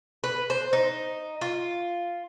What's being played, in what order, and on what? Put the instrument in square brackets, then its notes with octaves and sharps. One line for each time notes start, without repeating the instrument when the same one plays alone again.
[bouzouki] B4
C5
D#4
F4